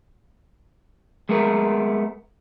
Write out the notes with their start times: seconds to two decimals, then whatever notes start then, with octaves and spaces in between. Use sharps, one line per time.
1.29 G#3 A3 B3 A#4